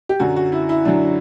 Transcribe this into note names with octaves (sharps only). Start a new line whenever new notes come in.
G4
F#2 D3 F#3 F#4
F#4
E4
E4
F#2 D3 F#3 D4